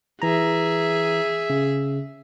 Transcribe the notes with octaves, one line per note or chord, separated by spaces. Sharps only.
E3 G#4 E5 A#5
C#3